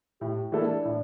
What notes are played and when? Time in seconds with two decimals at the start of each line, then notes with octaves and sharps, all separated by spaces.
0.21 A2 G4
0.52 E3 A#3 D4 E4 A4
0.85 A2